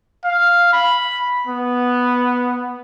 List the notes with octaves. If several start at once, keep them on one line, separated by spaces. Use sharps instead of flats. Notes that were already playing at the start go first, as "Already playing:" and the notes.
F5
B5
B3